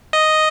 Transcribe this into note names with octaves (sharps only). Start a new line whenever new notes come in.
D#5